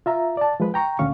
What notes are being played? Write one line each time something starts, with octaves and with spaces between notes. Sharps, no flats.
F4 E5 A#5
D5 A5
F3 G#3 B4
G5 A#5 C#6
D2 A#2 D3 C#4 F5 C#6